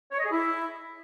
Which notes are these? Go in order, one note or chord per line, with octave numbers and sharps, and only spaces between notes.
C#5
D#5
G#4
E4